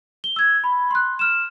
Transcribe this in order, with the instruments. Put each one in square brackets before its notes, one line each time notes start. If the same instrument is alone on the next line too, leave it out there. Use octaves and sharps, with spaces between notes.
[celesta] G7
E6 G#6
B5
C6 F#6
F6 E7